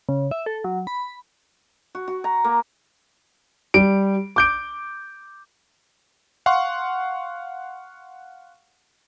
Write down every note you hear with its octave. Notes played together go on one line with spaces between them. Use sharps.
C#3
E5
A4
F#3
B5
F#4
F#4
A#5
A#3
G3 D7
D6 G6 D7
F5 F#5 C6 C#6